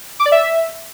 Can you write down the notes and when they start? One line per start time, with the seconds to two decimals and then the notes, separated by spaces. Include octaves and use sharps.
0.20 D6
0.26 D5
0.32 E5